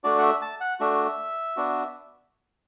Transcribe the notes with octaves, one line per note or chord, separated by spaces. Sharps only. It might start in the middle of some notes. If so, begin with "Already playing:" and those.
A3 D4 F#4 D5
F#5
E5
A5
F#5
A3 D4 F#4 E5
B3 D4 F#4